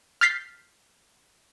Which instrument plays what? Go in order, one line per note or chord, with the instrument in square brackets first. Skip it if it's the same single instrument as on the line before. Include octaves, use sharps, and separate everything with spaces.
[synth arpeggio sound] F6 G6 A6 B6 C7